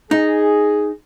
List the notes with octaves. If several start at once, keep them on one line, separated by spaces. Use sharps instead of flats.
D#4 G#4